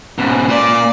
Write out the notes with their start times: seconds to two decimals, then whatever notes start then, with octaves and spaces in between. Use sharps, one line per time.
0.18 G#2 B2 C#4
0.49 A#2 D5